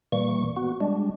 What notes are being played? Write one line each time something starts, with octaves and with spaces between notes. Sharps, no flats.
A#2 E3 G3 A#3 C#6
B3 F#4
G3 G#3 D4